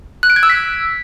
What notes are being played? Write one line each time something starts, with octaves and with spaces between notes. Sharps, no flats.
F#6
D7
G#6
E6
B6